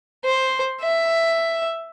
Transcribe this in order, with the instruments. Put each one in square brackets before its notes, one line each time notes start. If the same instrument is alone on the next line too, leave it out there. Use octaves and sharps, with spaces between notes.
[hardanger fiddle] C5
E5